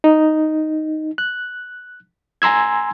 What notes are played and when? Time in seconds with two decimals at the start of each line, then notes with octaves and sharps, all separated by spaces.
0.04 D#4
1.18 F#6
2.42 G#5 A#5 C6 E6 G#6